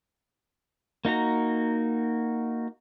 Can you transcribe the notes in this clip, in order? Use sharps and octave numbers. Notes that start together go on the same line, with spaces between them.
A#3 D#4 F#4 A#5